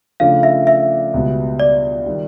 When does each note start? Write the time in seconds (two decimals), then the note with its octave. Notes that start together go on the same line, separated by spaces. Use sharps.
0.20 C#3 F3 A3 D4 F5
0.43 E5
0.67 E5
1.14 C#2 B2 G3 B3
1.60 D5
2.06 D#3 G3